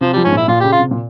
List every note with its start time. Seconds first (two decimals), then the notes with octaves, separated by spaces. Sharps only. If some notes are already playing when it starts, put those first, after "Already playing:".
0.01 C3 F3
0.13 G3
0.16 F3
0.24 G#2 C#4
0.33 A#2 E4
0.48 A#2 F4
0.60 G4
0.63 C#3
0.72 F4
0.80 C3
0.91 A#2